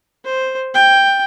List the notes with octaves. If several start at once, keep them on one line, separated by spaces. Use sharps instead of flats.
C5
G5